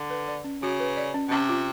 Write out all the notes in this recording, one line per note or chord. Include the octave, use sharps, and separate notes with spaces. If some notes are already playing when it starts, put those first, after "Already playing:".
Already playing: D3
B4
D5
C#4
C#3 F#4
B4
D5
C#4
B2
C3 C#4
F4